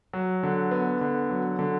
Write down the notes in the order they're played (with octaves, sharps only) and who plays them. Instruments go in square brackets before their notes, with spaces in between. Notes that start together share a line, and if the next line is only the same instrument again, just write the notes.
[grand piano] F#3
D3
B3
D3
F#3
D3